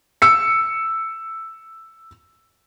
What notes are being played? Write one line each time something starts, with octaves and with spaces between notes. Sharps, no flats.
E6 C#7